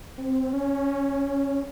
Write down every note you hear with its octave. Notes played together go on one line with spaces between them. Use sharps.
C4
C#4